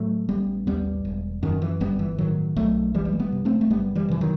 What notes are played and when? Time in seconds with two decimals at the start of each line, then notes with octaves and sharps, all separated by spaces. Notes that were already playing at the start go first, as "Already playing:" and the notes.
Already playing: A2 F#3 A3
0.29 A1 G3 B3
0.67 D#2 G3 B3
1.05 E1
1.43 F#2 D#3
1.62 E3
1.80 G1 G3 B3
1.99 E3
2.18 A2 D#3 F#3
2.56 B1 F#3 A3
2.94 F#1 E3 G3
3.05 G3
3.13 A3
3.20 G3 B3
3.32 C3
3.45 A3 C4
3.61 A3
3.70 F#1 G3 B3
3.95 E3 G3
4.08 C3 E3
4.21 D#3 F#3